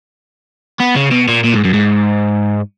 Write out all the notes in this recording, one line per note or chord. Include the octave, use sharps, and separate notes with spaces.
B3
C#3
B2
A#2
A#2
G#2
F#2
G#2